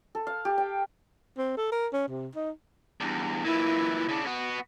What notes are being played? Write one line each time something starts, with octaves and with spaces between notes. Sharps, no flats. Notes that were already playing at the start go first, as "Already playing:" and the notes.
A4
F5
G4
G5
C4
A4
A#4
C#4
C3
D#4
E2 G2
A#2 E3 E4
C#3 D4
B3 F#4